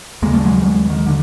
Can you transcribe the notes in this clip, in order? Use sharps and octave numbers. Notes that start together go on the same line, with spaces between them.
D#2 C#3 G#3 A#3
G3 A3
F#3 G#3
D#3
D3